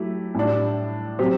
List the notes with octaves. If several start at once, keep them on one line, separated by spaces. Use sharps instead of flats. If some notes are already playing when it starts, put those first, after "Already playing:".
Already playing: F#3 A3 E4 G4
A2 G3 D4
C3 F#3 C4 G4